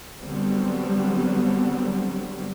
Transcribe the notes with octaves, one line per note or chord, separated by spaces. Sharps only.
D3 F#3 G3 B3 C4